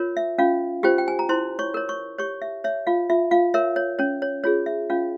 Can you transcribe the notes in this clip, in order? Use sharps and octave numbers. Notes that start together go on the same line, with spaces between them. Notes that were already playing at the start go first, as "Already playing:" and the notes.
Already playing: F4 A#4 C#5
E5
C#4 F4 F5
F4 G4 C5 G5
G5
G#5
A#5
E4 C5 C6
C#5 C#6
A#4 C#5
C#5 C#6
G4 C#5 C#6
E5
C#5 E5
F4 F5
F4 E5
F4 F5
A#4 C#5 E5
C#5
C#4 C#5
C#5
F4 G#4 C#5
E5
C#4 F4 F5